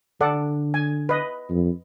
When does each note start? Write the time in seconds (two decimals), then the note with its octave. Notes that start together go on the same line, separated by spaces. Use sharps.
0.21 D3 A4 D5 F#5
0.74 G#5
1.09 B4 D#5
1.50 F2